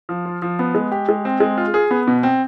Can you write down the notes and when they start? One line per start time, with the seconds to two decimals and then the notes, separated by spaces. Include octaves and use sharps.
0.09 F3
0.26 F4
0.42 F3
0.59 B3
0.75 G#3
0.92 G4
1.09 G#3
1.25 C4
1.40 G#3
1.58 F4
1.74 G#4
1.91 B3
2.07 B2
2.23 C4